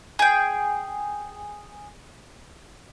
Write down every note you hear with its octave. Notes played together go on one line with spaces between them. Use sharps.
G#4 G5